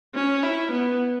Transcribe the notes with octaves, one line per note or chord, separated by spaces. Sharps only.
C#4
E4
B3